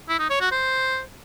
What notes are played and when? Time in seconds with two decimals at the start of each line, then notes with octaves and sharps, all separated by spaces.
0.09 E4
0.19 D#4
0.30 C#5
0.41 F#4
0.52 C5